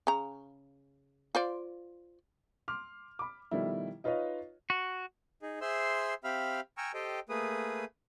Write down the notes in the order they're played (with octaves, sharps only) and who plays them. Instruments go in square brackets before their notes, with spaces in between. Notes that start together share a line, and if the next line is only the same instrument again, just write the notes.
[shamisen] C#3 A#5
F4 C5 D5
[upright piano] C6 D6 F6
B5 D6
B2 D#3 F3 G3 A3 E4
D#4 F4 B4 C#5 D#5 F5
[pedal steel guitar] F#4
[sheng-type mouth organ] D#4 G#4
G#4 C5 E5 C6 E6
C4 G4 E5 F5 B5 F6
G5 G#5 A#5 C#6 E6 F6
G4 A4 C5 D#5 G5
A3 A#3 G#4 B4 D#6